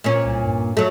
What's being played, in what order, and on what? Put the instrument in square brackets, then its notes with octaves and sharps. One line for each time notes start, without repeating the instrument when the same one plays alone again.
[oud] A#2 C#4
[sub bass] C2
G2
[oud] F#3 A3